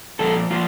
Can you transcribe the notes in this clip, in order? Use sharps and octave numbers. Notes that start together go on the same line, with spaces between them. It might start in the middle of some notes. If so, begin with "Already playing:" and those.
A#2 F3 A#3 A4
F3 A#3 F4